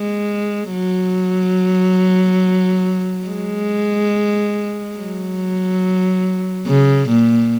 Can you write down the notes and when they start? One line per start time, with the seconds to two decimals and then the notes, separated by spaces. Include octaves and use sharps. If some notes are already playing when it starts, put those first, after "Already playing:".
Already playing: G#3
0.72 F#3
3.27 G#3
4.97 F#3
6.67 C#3
7.09 A#2